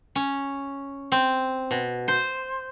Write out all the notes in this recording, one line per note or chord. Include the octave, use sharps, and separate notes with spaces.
C#4
C4
B2
C5